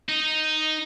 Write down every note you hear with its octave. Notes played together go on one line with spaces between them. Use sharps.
D#4